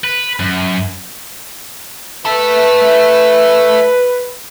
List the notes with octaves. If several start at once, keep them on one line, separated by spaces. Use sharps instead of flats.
B4
F#2
A3 A4 B4